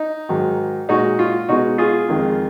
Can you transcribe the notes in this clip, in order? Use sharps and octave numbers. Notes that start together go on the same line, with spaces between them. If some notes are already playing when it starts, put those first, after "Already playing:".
Already playing: D#4
G#2 D#3 F#3
A#2 G#3 D#4 F#4
F4
B2 G#3 D#4 F#4
F4 G#4
F2 D#3 G#3